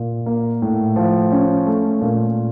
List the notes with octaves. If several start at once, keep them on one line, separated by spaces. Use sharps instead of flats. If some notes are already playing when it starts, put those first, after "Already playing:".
Already playing: A#2
A#3
A2
F3
C#4
A3
A#2